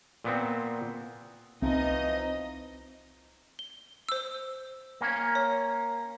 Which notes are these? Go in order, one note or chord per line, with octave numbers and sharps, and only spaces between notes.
A#2 B3 C4
C2 E3 F3 C4 D#4 D#5
G7
C5 E6
A#3 C#4
C#5